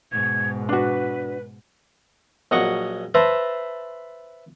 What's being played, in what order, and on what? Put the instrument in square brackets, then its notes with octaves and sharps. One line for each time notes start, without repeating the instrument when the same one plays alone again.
[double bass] G#2 B2 [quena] G#6
[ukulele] D4 F#4 [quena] B4
[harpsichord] A#1 F#3 D#5 F#5 C#6
B4 C5 E5 A5 A#5